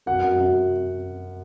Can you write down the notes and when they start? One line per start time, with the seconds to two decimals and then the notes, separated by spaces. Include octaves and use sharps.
0.06 F#2 F#5
0.23 F#2
0.40 F#2